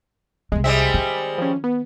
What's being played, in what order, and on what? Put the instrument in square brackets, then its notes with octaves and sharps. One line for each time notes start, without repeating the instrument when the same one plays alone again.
[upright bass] C2 A3 [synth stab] G#3
[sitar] G3 G#3 C4 [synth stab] E5
[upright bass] D#3
[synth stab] F3 C#4
B3